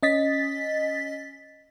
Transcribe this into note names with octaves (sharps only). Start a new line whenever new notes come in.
C#4 D#5 A6 B6